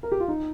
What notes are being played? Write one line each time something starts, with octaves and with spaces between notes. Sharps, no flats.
A#4
G4
F4
D#4